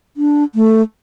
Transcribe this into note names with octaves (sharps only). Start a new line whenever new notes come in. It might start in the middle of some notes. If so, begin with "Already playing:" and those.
D4
A3